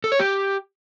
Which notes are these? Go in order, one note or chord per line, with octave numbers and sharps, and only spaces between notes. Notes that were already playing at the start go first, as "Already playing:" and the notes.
A4
C#5
G4